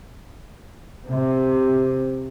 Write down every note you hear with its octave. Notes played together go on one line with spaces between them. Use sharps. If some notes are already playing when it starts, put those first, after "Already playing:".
C3